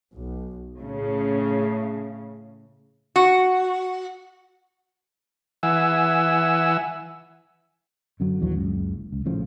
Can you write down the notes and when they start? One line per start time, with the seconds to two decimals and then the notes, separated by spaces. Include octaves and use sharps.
0.13 B1
0.81 A2 C#3
3.16 F#4
5.63 E3 E5 F#5 G#5 E6
8.20 F#2 D3 F#3
8.40 A#1 D#2 E3 F#3
8.55 F#1 C#2
9.12 C#2
9.25 A#1 A2 C#3 F3